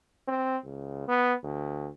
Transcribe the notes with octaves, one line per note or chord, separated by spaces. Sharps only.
C4
C#2
B3
D2